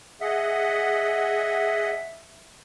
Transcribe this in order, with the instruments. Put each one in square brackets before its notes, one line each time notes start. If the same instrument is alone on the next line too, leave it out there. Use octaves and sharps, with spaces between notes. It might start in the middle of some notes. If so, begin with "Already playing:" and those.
[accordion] G#4 D#5 F#5 [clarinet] E5